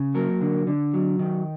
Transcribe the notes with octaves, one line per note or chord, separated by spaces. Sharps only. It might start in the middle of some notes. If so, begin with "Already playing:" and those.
Already playing: C#3
F#3 A#3 A#4
D3
D3
F#3
D#3